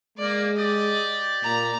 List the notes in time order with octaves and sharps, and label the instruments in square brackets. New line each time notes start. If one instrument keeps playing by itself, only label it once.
[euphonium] G#3 [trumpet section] A#3 [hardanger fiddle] D5
[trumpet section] G4 D5 [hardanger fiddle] D#5
[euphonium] A#2 [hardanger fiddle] A#5